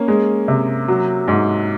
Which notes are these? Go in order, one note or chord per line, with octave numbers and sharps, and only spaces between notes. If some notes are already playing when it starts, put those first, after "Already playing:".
Already playing: A#3 C#4
G#3
C3
F#3
G#2